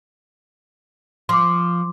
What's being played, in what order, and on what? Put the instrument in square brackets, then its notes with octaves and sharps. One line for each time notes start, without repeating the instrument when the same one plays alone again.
[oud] F3 [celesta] C6 D6